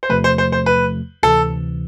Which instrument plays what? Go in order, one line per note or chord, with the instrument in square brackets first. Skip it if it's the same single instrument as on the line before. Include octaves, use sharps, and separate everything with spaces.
[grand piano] C5
[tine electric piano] E2 C3 F3 A3 [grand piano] B4
[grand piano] C5
C5
C5
B4
[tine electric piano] D2 C3 E3 [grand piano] A4